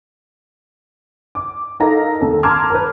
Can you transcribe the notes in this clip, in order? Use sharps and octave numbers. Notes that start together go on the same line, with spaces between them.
D6
D#4 A4 A#4 F5 A#5 A#6
D#2 A4
A5 A#5 C6 D6 F6 G#6
A#4 B4